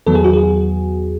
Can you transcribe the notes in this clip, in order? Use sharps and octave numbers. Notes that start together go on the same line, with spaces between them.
E2 D#3 F#3 B3 A4
G#4
F#4
G#4